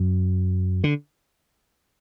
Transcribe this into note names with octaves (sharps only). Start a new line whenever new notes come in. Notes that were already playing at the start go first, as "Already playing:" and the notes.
Already playing: F#2
D3